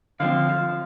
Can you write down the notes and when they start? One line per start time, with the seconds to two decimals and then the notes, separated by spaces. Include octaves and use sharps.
0.20 D3 F3 C4 F5
0.49 F3